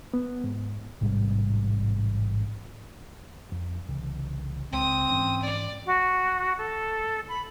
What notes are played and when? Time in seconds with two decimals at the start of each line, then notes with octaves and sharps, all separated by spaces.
0.14 B3
0.44 G#2
1.01 A1 G#2 C3 G3
3.52 F2
3.88 C2 C#3 E3
4.72 C#2 G#3 C4 D#6
5.11 G#2 E3 C#4
5.42 D5
5.86 F#4
6.58 A4
7.28 B5